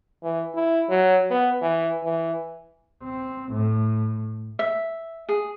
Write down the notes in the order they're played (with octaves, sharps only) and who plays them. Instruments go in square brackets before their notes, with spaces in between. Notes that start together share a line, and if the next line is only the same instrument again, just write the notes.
[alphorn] E3
E4
F#3
B3
E3
E3
[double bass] C4
A2
[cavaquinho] E5
G#4